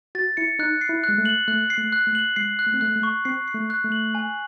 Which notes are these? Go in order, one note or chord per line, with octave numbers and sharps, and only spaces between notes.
F#4 A6
E4 C#7
D#4 F#6
C7
E4
G#3 F#6
A3
F#7
A3 F#6
C7
A3
F#6
A3
F#7
G#3 C7
F#6
A3
C4
A3 F#6
A3
C#6
C4 C7
C7
A3
F#6
A3
F#7
G#5